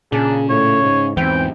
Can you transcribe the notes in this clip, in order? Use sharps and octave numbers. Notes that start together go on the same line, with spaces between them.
A#2 C#3 D4 G#4
A2 C#5
G#2
E2 G#2 E3 C4 G5